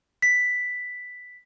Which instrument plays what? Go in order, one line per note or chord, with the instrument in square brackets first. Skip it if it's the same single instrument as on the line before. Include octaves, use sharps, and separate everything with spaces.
[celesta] B6